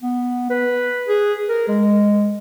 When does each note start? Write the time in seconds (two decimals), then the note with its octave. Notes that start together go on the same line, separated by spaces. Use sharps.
0.02 B3
0.50 B4
1.08 G#4
1.49 A#4
1.68 G#3